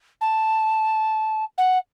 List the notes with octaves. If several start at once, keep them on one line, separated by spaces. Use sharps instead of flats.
A5
F#5